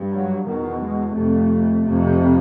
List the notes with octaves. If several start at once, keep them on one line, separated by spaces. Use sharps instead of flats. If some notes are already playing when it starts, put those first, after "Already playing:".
Already playing: G2
F#3
E2 B2 D#3
G#3
F2 C3 A3
F2 C3